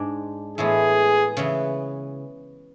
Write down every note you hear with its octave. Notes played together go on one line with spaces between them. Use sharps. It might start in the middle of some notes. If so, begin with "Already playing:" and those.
Already playing: G#2 G#3 D4
A2 E3 G#3 B3 G#4
C#3 E3 B3